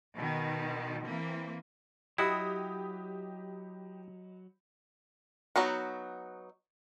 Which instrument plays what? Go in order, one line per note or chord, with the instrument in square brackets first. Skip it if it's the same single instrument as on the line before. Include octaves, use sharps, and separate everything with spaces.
[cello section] B2 D#3
E3 A#3 C4
[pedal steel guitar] F#3 [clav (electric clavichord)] E4 F#4 [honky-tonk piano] G4 D#6 [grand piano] D#5 B5
[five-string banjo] F#3 B3 D#4 F#4